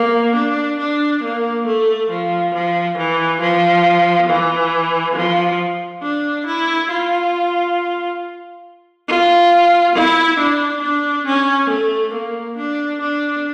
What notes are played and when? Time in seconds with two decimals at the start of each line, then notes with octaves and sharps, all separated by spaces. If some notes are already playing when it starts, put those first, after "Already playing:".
Already playing: A#3
0.35 D4
0.79 D4
1.23 A#3
1.66 A3
2.10 F3
2.54 F3
2.97 E3
3.40 F3
4.29 E3
5.16 F3
6.03 D4
6.46 E4
6.90 F4
9.08 F4
9.95 E4
10.39 D4
10.82 D4
11.26 C#4
11.70 A3
12.14 A#3
12.57 D4
13.01 D4